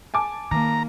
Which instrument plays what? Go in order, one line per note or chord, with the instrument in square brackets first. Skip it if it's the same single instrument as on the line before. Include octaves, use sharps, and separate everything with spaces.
[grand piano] G#5 A5 D6
[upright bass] D#3 [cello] A#3 [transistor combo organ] A#5